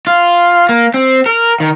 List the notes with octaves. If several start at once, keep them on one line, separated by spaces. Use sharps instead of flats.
F4
A#3
C4
A#4
D#3